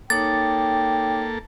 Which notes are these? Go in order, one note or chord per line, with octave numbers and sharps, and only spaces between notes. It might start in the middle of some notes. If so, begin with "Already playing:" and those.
A#3 D#4 A4 C#5 G5 D6 A6